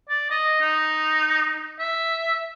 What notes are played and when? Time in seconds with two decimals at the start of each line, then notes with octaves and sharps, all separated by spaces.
0.09 D5
0.30 D#5
0.61 D#4
1.79 E5